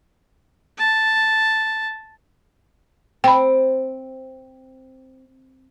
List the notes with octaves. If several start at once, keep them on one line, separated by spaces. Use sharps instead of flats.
A5
C4 G5 B5